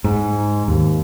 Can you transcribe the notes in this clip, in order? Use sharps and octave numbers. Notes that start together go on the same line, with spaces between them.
G#2
D#2